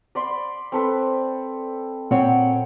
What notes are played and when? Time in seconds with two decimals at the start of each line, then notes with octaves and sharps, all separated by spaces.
0.15 D5 B5 C6
0.72 C4 A4 B4
2.11 A#2 C4 C#5 F#5 G5